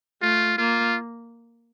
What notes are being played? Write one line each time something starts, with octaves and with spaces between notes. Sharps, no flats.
A3 F4
A#3 F4